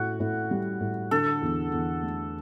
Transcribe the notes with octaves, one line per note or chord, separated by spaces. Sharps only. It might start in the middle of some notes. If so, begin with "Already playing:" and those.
Already playing: A2 F#4
A2
G3
A2
D3 A4
E2
E2
A3